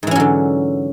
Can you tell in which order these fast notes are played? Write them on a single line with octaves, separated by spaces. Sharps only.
G#2 E3 C#4 F#3 D3